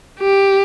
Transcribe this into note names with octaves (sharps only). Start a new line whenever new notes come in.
G4